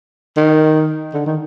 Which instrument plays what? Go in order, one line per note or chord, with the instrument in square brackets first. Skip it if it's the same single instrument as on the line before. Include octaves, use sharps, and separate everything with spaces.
[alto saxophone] D#3
D3
D#3